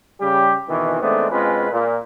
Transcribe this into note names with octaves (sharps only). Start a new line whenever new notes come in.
C#3 G3 G4
F2 B2 D#3 E3
D#3 G#3 A3 B3 C4 D4
B2 G#3 C4 C#4 F4 B4
A#2